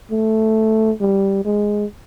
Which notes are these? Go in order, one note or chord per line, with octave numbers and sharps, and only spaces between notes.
A3
G3
G#3